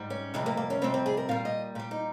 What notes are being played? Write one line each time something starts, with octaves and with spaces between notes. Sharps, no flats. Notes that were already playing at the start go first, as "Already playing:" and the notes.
Already playing: G#2 G3
C#4
F2 C3 G3 G#3
A#3
A#3
C#4
F2 C3 G3 C4
C4
G#4
A#4
A#2 G3 F5
D#5
A#2 G3 G4
D#4